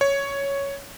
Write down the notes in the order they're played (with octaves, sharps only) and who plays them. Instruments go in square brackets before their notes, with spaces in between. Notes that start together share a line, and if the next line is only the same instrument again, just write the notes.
[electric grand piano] C#5